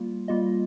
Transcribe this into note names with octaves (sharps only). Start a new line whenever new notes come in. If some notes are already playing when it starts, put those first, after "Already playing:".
Already playing: G3 A#3 F4
G3 A#3 F4 D#5